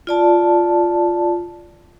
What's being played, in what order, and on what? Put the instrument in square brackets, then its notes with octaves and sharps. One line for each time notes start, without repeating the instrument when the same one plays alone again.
[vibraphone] F4 D5 A5